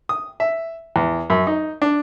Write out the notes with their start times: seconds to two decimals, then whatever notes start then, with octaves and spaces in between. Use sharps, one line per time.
0.09 D#6
0.40 E5
0.96 E2
1.30 F#2
1.47 D#4
1.82 D4